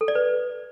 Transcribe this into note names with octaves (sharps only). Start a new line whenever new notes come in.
A4
D5
B4